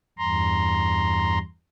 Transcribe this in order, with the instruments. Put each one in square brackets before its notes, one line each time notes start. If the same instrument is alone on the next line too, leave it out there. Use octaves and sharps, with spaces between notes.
[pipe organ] E2 G2 A#5 C6